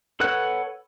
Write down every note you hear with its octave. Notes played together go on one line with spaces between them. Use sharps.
A4 B4 C#5 F#5 F#6